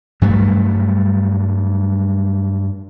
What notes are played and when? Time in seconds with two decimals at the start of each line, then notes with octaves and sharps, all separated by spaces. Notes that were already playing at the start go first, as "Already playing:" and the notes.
0.21 G2 F#3 G3 A3